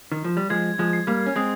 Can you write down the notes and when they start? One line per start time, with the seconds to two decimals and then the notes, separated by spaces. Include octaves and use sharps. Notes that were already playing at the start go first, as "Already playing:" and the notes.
0.12 D#3
0.24 F3
0.37 G3
0.50 F3 G#3 G#6
0.79 F3 G#3
0.93 C7
1.07 G3 A#3
1.26 C#4
1.36 G#3 C4 D#6